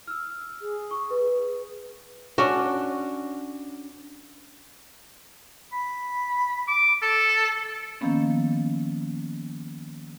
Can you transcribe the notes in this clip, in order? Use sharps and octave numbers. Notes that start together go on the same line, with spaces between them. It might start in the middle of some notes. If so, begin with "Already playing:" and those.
E6 F6
G#4
C#6
B4
C#4 D4 F#4
B5
D6
A4
D#3 F3 A#3 B3 C#4